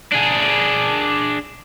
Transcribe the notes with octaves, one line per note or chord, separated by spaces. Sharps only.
D4 G#4